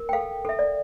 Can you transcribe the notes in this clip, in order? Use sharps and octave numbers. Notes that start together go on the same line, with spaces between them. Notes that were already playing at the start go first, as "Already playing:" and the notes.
Already playing: A#4
G5
A4 F5
A4 E5
D5